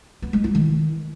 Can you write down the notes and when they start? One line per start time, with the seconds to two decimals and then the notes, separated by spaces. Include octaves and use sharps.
0.22 B3
0.33 G#3
0.44 E4
0.55 D#3